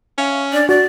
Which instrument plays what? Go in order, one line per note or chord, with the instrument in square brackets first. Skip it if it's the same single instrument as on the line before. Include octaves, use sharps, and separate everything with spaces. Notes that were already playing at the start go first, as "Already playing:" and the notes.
[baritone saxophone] C#4 [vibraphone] E5 F5 C#6
[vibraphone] D4 [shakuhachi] D5
[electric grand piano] F#4 [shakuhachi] D5